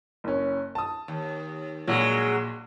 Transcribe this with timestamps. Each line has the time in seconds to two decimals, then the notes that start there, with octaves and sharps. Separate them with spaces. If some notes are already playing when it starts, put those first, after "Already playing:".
0.24 F#1 C#4
0.75 A5 D#6
1.08 D#2
1.87 A#1 F#3 G#3